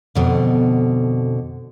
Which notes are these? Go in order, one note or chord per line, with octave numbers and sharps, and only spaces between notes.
F2 B2 D3